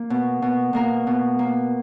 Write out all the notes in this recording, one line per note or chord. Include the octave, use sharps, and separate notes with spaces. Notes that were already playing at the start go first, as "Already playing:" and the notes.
Already playing: A#3
B2
B2
B2 A#3 A#4
B2
A#3